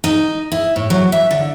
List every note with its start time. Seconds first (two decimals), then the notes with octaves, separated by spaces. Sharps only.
0.04 D#4
0.52 E4
0.76 A2
0.90 F#3
1.12 E5
1.31 D3